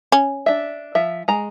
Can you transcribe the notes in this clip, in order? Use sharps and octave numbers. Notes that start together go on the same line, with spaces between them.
C#4
D4 E5
F3 E5
G#3 A#5